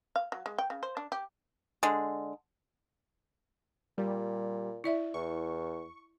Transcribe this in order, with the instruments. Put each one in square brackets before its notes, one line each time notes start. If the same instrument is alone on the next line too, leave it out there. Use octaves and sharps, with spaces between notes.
[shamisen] F5
F#3
G#3
G5
C#3
C5
D4
G4
[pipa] D3 G#3
[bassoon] A#2 [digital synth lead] G3
[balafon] E4 D5 E5
[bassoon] E2 [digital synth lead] C#6